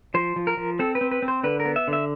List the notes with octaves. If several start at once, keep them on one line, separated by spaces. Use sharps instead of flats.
F3 C5
F3
A#4
F3
C4 A4
B4
C4
B4
C4
C5
D3 B4
A#4
B3
E5
D3
E5